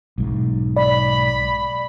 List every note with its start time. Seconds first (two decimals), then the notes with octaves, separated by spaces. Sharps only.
0.18 B1 G#2
0.77 D5 B5